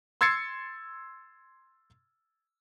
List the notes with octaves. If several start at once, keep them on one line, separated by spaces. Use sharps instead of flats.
C6 E6 G#6 A6 C7 C#7